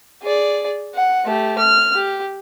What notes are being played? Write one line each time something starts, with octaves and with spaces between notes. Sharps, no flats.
G#4 D5
F#5
A3 G4
F6
G4